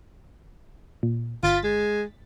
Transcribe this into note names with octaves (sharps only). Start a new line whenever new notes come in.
A#2
G1 F4 A6 B6
G#3